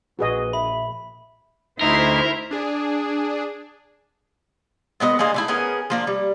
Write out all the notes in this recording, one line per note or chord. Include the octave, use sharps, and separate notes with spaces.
A#1 F#4 G#4 B4 D#5
E5 B5
D2 D#4 E4 A#4 C5
D4 G#4
A#2 G#3 B3 D#5
G#3 A#3 D4 G#4
D3 A3 E4
B3 C#4 G#4 A#4
F3 A#3 D4
G3